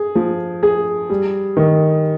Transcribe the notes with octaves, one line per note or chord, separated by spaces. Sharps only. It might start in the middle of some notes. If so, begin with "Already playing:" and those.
Already playing: G#4
F3
G#4
G3
D#3